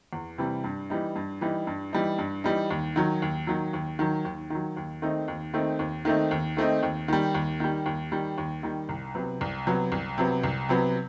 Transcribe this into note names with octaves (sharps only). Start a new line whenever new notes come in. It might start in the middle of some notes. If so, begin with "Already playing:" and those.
E2
C3 E3 G3
G2
E3 G3 D#4
G2
E3 G3 D#4
G2
E3 G3 D#4
G2
E3 G3 D#4
D#2
D#3 F#3
D#2
D#3 F#3
D#2
D#3 F#3
D#2
D#3 F#3
D#2
D#3 A3 C4 D#4
D#2
D#3 A3 C4 D#4
D#2
D#3 A3 C4 D#4
D#2
D#3 A3 C4 D#4
D#2
D#3 G3
D#2
D#3 G3
D#2
D#3 G3
D#2
D#3 G3
C2
C3 F#3 B3
C2
C3 F#3 B3
C2
C3 F#3 B3
C2
C3 F#3 B3